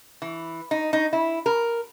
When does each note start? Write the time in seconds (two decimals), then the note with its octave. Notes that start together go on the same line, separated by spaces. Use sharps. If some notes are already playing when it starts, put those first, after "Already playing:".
0.22 E3
0.71 D#4
0.93 D#4
1.13 E4
1.46 A#4